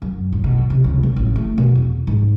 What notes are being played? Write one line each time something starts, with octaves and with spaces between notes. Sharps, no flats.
F#2
A2
B2
C3
C#2
B1
A1
A3
B2
E2
G#2